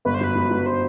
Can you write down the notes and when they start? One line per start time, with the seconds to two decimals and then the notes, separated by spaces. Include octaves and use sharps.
0.05 G1 B4
0.14 C5
0.21 F#2 B4
0.35 F#2
0.51 F#3
0.66 C5